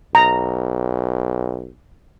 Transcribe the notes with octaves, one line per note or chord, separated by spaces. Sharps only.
B1 A#5